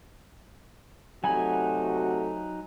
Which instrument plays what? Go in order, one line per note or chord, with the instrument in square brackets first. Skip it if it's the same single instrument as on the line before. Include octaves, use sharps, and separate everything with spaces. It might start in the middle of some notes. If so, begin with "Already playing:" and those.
[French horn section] C3 A3 F#4 [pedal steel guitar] F#3 D#4 B5 [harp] G#5